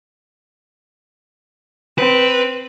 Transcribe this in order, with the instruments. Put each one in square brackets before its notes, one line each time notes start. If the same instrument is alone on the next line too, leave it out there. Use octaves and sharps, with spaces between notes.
[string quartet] C4 [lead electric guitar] B4